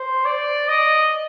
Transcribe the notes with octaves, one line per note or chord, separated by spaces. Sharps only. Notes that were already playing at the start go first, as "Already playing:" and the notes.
Already playing: C5
D5
D#5